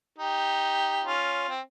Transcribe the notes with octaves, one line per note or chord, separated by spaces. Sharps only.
D#4 G4
C#4 F4
C4